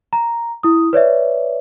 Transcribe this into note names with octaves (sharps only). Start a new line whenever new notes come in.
A#5
E4 D#6
B4 C#5 D5 E5